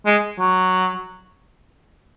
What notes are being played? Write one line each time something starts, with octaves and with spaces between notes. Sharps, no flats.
G#3
F#3